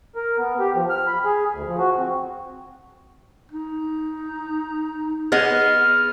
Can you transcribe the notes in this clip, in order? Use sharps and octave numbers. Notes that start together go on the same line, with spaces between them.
A#4
B3
G4
F3
F6
B5
G#4
D2
F3
F#4
C4
D#4
B3 G#4 D#5 F6